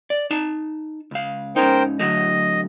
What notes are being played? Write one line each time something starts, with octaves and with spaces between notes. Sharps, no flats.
D5
D#4 A5
C#2 F5
G#2 C#4 D#4 A#4 C5 G5
D3 F#3 A3 D#5